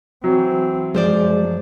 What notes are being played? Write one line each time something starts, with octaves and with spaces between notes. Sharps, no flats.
E3 F#3 C4
F#2 F3 G#3 C5 D5